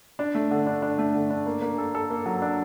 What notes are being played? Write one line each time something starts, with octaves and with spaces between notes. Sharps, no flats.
D4
A3
D3
D4
D4
A3
D3
D4
A#3
A#3
A4
A4
A#3
F#3
D4